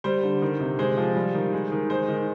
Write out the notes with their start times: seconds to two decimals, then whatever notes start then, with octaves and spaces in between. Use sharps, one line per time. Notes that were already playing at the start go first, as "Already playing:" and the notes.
0.04 G3 C5
0.23 D3
0.42 D#3
0.60 C3
0.79 G#3 C5
0.97 F3
1.16 G3
1.34 D#3
1.53 G#3
1.72 D#3
1.90 G#3 C5
2.08 D#3